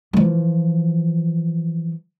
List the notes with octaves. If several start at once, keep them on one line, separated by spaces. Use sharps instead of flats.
E3 F3